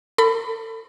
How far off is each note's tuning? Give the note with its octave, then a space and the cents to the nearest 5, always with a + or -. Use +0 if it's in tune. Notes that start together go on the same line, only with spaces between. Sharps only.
A4 +40 B5 +20